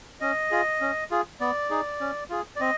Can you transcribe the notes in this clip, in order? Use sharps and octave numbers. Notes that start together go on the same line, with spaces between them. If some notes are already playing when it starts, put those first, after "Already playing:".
C#4 D#5
F4 G#4
C#4
F4 G#4
B3 D5
D#4 G#4
C#4
F4 G#4
D5
C4 D#5